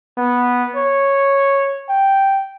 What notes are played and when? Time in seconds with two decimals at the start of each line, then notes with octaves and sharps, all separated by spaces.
0.17 B3
0.76 C#5
1.89 G5